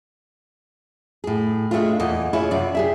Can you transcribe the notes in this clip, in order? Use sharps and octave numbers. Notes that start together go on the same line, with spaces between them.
A2 G#4
G#3 A3 C4 D4 F4
E2 A#2 D#5
E4 F4 G#4 C#5
F#2 C3 D5
G4 G#4 E5